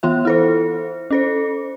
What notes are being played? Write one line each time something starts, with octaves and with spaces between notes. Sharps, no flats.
E3 B3 F4 E5
E4 A4 C5
C#4 A4 C5